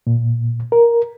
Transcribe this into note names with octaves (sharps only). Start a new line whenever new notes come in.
A#2
A#4